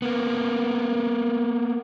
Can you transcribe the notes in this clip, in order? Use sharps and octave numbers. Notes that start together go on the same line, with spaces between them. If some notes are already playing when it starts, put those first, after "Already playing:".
A#3 B3